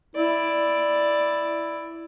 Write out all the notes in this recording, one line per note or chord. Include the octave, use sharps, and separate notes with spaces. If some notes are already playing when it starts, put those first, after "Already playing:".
E4 D5